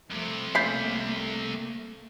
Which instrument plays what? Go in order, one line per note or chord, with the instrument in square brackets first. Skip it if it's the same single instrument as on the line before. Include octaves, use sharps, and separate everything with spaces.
[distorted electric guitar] C2 C3 [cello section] F3 A3
[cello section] A3 A#3 [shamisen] C#4 E4 F4 [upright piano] G6 B6 C7